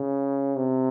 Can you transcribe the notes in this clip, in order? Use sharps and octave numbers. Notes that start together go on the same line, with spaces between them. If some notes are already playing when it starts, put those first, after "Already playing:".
Already playing: C#3
C3